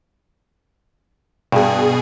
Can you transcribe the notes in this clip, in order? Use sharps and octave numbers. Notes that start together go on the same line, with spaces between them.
G2 B2 G#4